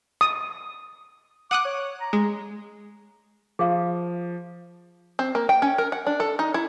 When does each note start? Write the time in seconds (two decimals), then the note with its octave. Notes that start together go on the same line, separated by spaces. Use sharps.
0.21 D#6
1.51 F#5 D6 D#6 F#6
1.65 C#5
2.00 A#5
2.13 G#3
3.59 F3 G#4 F5
5.19 C4
5.35 A#3
5.49 G5
5.62 C#4
5.78 A#4
5.92 F#5
6.07 D4
6.20 A4
6.39 D#4
6.54 E4